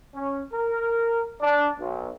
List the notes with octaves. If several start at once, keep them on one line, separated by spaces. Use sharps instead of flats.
C#4
A#4
D4
B1